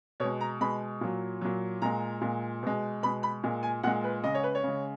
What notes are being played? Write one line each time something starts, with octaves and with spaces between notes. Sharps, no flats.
B2 C#5
G#3
A#5
B2 G#3 B5
A#2 F#3
A#2 F#3
A#2 G#3 A#5
A#2 G#3
B2 G#3
B2 G#3 B5
B5
A#2 G#3
G#5
A#2 G#3 F#5
B4
C#3 G#3 D#5
C#5
B4
C#5
C#3 G#3